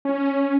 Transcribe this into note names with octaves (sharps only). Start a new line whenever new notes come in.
C#4